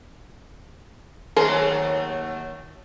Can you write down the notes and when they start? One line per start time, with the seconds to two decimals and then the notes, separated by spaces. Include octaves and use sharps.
1.36 D#2 F#3 A3 G#4 A#4 C5